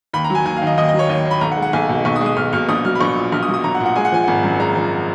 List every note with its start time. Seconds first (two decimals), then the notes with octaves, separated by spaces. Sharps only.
0.13 D#2 B5
0.24 A#5
0.30 F#3 G#5
0.45 D#2 G#5
0.56 F5
0.62 D#3
0.67 D#5
0.77 D#2 D#5
0.89 D#5
0.94 F#3
0.99 C#5
1.09 D#2 D#5
1.25 D#3
1.31 B5
1.41 B1 A#5
1.52 F#5
1.57 G#3
1.62 F#5
1.73 B1 G#5
1.89 B2
2.05 B1 C#6
2.16 D#6
2.21 G#3
2.26 D#6
2.37 B1 F6
2.53 B2 F6
2.69 A#1 D#6
2.85 F#3 F6
2.95 B5
3.00 A#1 C#6
3.16 A#2
3.32 A#1 F6
3.43 D#6
3.49 F#3
3.54 D#6
3.64 A#1 A#5
3.75 F#5
3.80 A#2
3.85 F#5
3.96 G#3 G#5
4.05 F#5
4.12 F3 G#5
4.24 G#1 F#5
4.44 F#2
4.60 G#3 A#5
4.76 F3